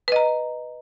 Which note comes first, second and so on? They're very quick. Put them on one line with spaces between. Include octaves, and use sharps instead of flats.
B4 D#5 A#5